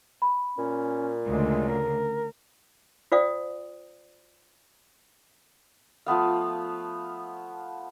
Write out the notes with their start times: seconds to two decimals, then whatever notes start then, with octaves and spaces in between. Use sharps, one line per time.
0.22 B5
0.58 A#2 C#4
1.25 D2 C#3 G#3
1.68 A#4
3.12 F4 C5 D5 F5 G5 D#6
6.06 F3 A3 B3 F5